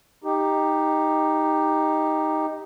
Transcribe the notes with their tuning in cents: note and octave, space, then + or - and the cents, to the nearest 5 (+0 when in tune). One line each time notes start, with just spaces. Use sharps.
D#4 +0 G4 +10